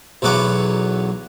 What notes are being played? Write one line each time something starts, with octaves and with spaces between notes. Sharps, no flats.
B1 E2 F#3 B3 F#5 D6